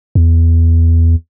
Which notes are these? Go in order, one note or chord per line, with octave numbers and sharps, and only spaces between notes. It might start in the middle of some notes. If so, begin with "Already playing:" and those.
E2